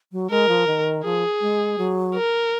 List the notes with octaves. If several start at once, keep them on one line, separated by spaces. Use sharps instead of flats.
F#3
G#3 A#4
F3
D#3
F3 G#4
G#3
F#3
A#4